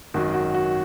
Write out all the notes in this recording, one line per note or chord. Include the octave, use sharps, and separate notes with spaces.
G#1 F#2 D#3 F#3 F#4
F#4
F#4